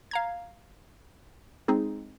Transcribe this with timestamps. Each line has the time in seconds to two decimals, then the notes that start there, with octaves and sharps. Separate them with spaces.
0.11 F5 A#5 G#6
1.68 G#3 C4 D#4 G#4